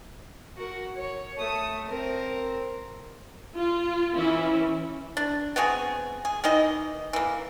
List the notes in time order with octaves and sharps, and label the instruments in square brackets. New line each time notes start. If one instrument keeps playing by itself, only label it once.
[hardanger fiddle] F#4 A#4
C#5
A3 D#6
C4 A#4
[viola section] F4
E3 C#4 E4
[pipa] D4
B3 C4 F#4 G#4
G#4
D#3 E3 D#4 D#5
E3 A#3